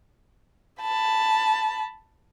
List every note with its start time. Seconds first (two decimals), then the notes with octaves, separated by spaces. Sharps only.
0.82 A5 B5